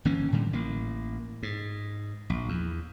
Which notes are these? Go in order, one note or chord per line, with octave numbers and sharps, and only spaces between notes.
G1 E3 A#3 C#4
A2 D3 G3
A1 A#3
G#2
A#1
E2